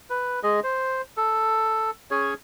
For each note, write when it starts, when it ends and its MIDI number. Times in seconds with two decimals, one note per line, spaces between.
0.10 0.40 71
0.43 0.60 56
0.43 0.60 68
0.43 0.60 75
0.63 1.02 72
1.17 1.91 69
2.11 2.34 61
2.11 2.34 68
2.11 2.34 73